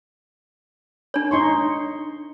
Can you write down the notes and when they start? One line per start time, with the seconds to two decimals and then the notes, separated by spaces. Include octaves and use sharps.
1.14 D4 C#5
1.31 D#4 C6 C#6